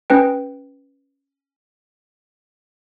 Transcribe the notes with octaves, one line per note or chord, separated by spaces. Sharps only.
C#4 B4 G5